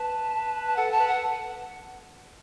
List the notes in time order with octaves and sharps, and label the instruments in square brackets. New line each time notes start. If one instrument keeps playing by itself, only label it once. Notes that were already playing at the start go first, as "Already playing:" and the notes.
Already playing: [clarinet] B4 [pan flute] A5
[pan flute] A5
[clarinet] A4 [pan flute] F#5
[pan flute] A5
[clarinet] B4
[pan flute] F#5